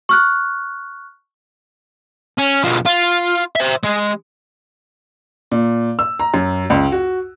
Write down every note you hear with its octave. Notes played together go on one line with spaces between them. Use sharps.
C#6 F6 F#6
C#4
B2 F3
F4
C5 E5
G#3
A#2
E6
A#5
F#2
C#2
F#4